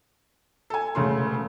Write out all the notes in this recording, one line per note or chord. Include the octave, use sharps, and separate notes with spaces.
A4 G#5
E1 C#3 A3 C6